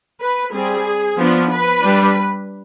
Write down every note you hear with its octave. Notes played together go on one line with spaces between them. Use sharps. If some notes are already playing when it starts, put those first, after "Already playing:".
B4
G3 C4 G#4
F3 B3 D4
B4
G3 D4